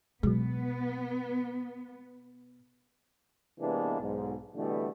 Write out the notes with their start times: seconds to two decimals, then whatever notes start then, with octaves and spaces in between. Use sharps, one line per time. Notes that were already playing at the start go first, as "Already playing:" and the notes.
0.23 B2 F#3 G#3 B3
3.60 C3 E3 G#3 A#3 B3 D4
4.00 B1 G#2
4.55 B2 D3 E3 G3 A3